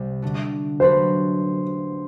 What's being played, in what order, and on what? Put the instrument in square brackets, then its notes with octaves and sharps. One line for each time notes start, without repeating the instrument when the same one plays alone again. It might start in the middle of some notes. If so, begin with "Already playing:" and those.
Already playing: [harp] C2 C3 G3 C4 G4
D3 A3 D4 F#4
[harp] F#3 A3 D4 F#4 B4 [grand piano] C5